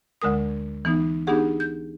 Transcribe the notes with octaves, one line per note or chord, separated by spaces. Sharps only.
D2 D3 G#3 A#4 D#6
E3 B3 D#4
B3 D4 D#4 G4 G#4 F#5
G6